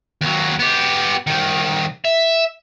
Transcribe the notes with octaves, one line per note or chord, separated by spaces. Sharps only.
D#2 F#3
B3 G4
C2 D#3
E5